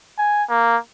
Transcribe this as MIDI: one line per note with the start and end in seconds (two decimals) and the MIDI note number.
0.18 0.44 80
0.50 0.77 58